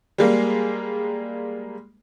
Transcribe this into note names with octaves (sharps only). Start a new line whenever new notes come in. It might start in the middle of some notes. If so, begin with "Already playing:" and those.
G3 G#3 A#3